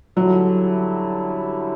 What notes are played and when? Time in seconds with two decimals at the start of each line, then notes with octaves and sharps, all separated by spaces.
0.17 D3 F#3 G3 C#4 E4 A4